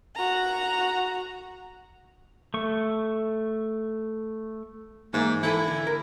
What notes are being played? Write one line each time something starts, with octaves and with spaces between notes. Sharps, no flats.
F#4 A#5
A3 C#6
G#2 E3 A#3
E3 E4 A4 G#5
D3
A#4